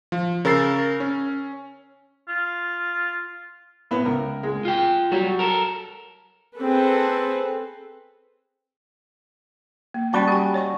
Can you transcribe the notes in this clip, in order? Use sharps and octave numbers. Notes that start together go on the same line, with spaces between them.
F3
C#3 A#4 E6 A6 C7
C#4
F4
A2 B3
C#2 A#4
G#3
F4 G5
F#3 G3 F#4
A4 A#4
C4 G#4 A4 B4
A#3
G3 C#4 F#4 A5 B5 C#6
G4 G#5
C#5 D#5 C#6